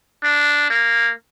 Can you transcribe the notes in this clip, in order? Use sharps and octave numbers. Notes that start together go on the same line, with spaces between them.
D4
A#3